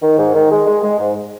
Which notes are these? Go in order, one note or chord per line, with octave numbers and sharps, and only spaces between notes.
D#3
G#2
D#3
G#3
G#3
G#3
G#2